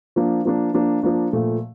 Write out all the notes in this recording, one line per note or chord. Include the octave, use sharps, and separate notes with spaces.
F3 A#3 D4
F3 A#3 D4
F3 A#3 D4
F3 A#3 D4
A#2 F3 A3